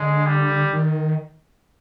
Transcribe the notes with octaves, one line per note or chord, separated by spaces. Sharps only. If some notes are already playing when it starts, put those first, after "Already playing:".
Already playing: D3 G#3
G3
D#3